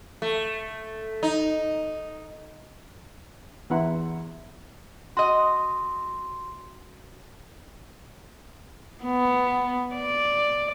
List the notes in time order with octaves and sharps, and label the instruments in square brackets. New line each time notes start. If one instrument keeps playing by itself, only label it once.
[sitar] A3
D#4
[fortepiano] E2 B3 E4 F#5 A#5 C6
[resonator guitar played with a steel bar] F#4 D#5 [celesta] C6
[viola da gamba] B3
D5